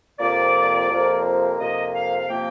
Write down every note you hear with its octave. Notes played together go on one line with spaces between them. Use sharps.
F2 C3 F3 A#3 D5
F2 C3 F3 A#3
F2 C3 F3 A#3 D#5
F5
F5
C3 F3 A#3 G5